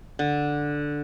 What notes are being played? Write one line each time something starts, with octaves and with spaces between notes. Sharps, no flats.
D3